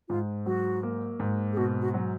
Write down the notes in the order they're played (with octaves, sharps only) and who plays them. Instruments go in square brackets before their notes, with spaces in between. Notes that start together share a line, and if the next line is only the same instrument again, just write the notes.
[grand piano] G#2 [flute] F4
[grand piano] F#3 [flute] F#4
[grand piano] A#3
G#2
[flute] G#4
[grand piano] B2 [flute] F#4
[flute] F#4
[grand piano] F#3